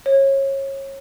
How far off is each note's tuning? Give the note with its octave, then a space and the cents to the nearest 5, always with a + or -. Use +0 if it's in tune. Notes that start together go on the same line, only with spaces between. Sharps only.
C#5 -25